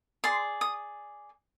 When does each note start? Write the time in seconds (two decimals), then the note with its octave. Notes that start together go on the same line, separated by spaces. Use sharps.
0.24 G#4 D5 C6
0.61 D#6